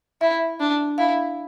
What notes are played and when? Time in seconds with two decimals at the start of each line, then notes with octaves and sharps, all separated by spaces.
0.21 E4 E5
0.60 D4
0.98 E4 F5